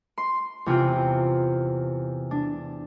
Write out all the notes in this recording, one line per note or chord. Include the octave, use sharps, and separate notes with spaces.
C6
E2 C3 F4 G5
D4